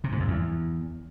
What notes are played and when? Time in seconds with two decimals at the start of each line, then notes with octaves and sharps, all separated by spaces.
0.04 C3
0.12 G#2
0.20 F2
0.28 E2